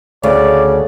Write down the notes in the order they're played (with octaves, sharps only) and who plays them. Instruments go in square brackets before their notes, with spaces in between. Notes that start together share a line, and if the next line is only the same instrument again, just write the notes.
[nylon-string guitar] D2 [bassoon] C#3 [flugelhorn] D5